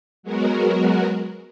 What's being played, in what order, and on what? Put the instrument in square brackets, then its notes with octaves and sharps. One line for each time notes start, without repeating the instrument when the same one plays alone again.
[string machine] F#3 G#3 B3 F#4 A#4